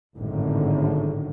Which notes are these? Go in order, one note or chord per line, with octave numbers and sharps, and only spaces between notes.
G#1 F#2 A2 D3